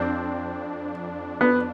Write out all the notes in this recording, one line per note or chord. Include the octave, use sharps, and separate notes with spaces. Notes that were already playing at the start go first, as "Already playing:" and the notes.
Already playing: F2 C4 D4
B3